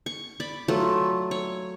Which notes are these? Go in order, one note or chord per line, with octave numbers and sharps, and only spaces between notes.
C#6
D5 B5
F#3 A3 F4
C#5